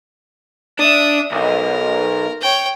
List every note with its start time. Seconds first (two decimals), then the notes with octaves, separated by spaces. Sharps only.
0.79 D4 E5 D#6
1.32 B1 A#4
2.42 C#5 G5